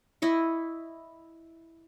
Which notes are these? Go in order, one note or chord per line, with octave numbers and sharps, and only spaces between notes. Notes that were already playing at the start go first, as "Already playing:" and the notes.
E4 D#5 C#6